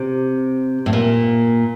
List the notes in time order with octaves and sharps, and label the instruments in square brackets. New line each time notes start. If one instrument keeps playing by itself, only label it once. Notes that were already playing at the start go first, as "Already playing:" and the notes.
Already playing: [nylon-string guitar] C3
A2
A#2